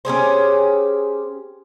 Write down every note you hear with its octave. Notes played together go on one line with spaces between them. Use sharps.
C#4 G4 G#4 C5